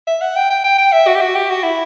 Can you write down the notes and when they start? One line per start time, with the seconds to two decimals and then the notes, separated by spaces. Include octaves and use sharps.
0.07 E5
0.22 F#5
0.36 G5
0.50 G5
0.64 G5
0.78 G5
0.93 E5
1.07 F#4
1.15 G4
1.21 F#4
1.35 G4
1.50 F#4
1.64 E4